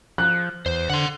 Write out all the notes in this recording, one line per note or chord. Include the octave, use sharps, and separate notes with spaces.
F3 F#6
E2 C5
D3 F#5 C6